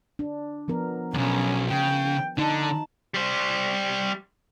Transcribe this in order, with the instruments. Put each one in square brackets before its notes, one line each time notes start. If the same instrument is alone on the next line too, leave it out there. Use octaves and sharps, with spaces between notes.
[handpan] D4
F3 B3 A#4
[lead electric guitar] B1 E2 [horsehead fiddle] C#4
[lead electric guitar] C#3 [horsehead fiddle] G5
[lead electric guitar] D3 D4 [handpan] D#4 [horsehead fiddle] A5
[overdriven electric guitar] G3 C5